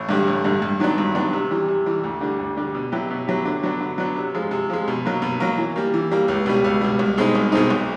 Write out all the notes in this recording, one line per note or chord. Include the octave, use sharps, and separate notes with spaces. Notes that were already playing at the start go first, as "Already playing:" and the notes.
Already playing: A1
G2 D3 G3
A1
G2 D3 G3
G2
D#3 F#3 B3 D4
G2
D#3 F#3 B3 D4
C3
E3 G3
C3
E3 G3
D2
D3 G3
D2
D3 G3
B2
F#3 B3 E4 G4
B2
F#3 B3 E4 G4
D3
F#3 B3 D4
D3
F#3 B3 D4
C3
F3 G#3
C3
F3 G#3
B2
F#3 A#3
B2
F#3 A#3
E3
G3 A#3
E3
G3 A#3
C#2
B2 G3
C#2
B2 G3
C2
B2 G#3 C4 D#4
C2
B2 G#3 C4 D#4
B1